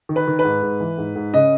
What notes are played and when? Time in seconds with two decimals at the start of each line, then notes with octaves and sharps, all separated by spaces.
0.09 D#3
0.16 B4
0.27 D#3
0.39 B4
0.45 G#2
0.62 G#2
0.80 E3
0.98 G#2
1.16 G#2
1.34 C#3 D#5